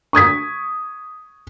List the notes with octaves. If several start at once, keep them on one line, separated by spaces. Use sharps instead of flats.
C#6 D#6 G#6 B6